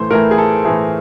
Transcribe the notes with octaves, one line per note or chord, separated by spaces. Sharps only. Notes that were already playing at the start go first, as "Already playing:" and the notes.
Already playing: A2 E3 A3 C5
A2 E3 A3 A#4
G#4
A4
A2 E3 A3 G#4